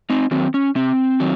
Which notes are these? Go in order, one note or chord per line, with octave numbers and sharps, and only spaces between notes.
C4 D#4
D#3 F#3 C4
C#4
C3 C4
D#3 F#3